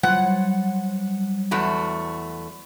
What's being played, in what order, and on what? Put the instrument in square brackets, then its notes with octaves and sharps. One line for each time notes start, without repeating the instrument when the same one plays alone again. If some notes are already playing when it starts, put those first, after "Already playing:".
[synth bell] F#3 G3 [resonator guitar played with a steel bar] F#5
[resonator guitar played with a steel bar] E2 A3 F#4